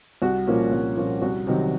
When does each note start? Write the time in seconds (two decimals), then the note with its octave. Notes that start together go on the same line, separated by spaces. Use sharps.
0.22 C2 F#4
0.47 A#2 F3 A#3 C#4
0.72 C2
0.97 A#2 F3 A#3 C#4
1.22 C2 F#4
1.47 C3 D#3 F#3